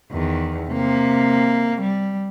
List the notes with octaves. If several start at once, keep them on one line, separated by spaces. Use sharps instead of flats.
E2 D#3
C3 A#3
G3